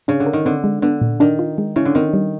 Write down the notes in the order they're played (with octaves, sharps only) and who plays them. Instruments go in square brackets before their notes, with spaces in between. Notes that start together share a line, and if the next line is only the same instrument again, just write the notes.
[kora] C#3 [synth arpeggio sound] D4
[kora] D3
[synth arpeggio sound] A#4
[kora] D#3
[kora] D3 [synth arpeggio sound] C4
[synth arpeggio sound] G#3
[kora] D3 [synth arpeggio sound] B3
[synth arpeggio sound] A#2
[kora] D#3 [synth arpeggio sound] D4
[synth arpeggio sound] F4
G#3
[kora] C#3 [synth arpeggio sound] E4
[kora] D3
[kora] D#3 [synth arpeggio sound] C4
[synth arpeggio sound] G3